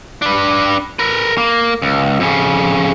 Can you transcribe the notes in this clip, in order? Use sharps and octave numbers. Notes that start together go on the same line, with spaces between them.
D4 B4
A#4 B4
A#3
C#2
F2 C#3